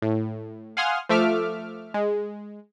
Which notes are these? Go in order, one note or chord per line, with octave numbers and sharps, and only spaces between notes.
A2
F5 F#5 G#5 C6 D#6 F6
F3 A3 E5 D6 F6
G#3